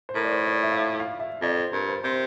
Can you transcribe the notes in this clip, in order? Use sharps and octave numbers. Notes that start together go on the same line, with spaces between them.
C5
A2 A#4
D5
C5
D5
E5
F5
E5
F5
E5
F2 D5
C5
G2 A#4
C5
C3 C5